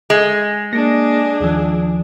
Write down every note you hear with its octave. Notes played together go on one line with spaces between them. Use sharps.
G#3
A#3 D4 G#4 A#6
D#2 D#3 F3